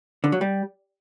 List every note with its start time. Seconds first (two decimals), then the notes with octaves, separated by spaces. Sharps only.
0.24 D3
0.32 F#3
0.41 G3